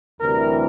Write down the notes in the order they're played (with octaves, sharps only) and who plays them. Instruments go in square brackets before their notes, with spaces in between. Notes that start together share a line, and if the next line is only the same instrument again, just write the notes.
[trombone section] D2 C3 E3 G3 A#4